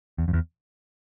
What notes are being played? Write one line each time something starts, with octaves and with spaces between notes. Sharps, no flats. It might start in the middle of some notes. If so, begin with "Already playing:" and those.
E2
F2
E2